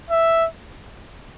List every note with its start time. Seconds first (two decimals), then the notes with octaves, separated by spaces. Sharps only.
0.10 E5